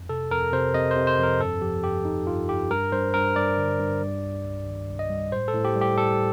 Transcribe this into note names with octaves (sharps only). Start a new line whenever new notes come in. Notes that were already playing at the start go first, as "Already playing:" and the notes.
Already playing: F2
C3 A4
F2 A#4
C3 C5
C3 D#5
C5
C3
C5
F2 A#4
G2 A4
F3 G4
G2 G4
G2 D#4
G2 F4
G2 G4
G2 A#4
G2 C5
G2 A#4
G2 D5
D3
G2
G3
C2
C2
D#3
C2
D#5
G3
A2 C5
A4
A2
G4
G3
G4
G3 A4